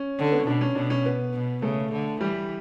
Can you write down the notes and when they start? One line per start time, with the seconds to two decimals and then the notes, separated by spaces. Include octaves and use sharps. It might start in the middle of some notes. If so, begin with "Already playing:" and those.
Already playing: C#4
0.19 D3
0.32 B3
0.39 C#4
0.47 B2 D4
0.61 C#4
0.75 B2 D4
0.90 C#4
1.05 B3
1.33 B2
1.62 C#3 A3
1.91 D3
2.21 E3 G3